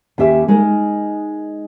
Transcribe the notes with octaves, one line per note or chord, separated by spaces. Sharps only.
D#2 C#4 G4 E5
G#3 D#4 A#4